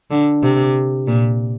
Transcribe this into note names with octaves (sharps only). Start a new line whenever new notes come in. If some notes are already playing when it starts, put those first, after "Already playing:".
D3
C3
A#2